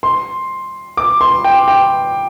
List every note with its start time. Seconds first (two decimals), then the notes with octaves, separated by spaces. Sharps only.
0.03 C6
0.97 D6
1.21 C6
1.44 G5
1.68 G5